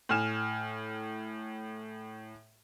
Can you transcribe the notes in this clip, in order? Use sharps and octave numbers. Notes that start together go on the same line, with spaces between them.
A2 G#5 F6 E7